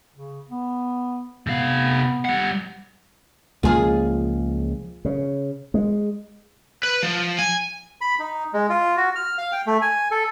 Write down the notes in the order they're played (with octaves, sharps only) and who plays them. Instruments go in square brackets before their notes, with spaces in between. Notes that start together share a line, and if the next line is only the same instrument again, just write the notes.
[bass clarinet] C#3
B3
[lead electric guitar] C3 F5 [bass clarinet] B3
[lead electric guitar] G3 F#5
[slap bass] C#2 F3 A#3 [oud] F4 G#4
[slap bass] C#3
G#3
[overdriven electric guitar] B4
F3
G#5
[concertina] B5
D#4
G#3
F4
F#4
F6
F5
G5
A3
G#5
A4